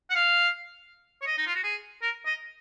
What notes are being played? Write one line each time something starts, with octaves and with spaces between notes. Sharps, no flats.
F#5
F5
C#5
D#5
D#4
F4
F#4
G#4
A#4
D#5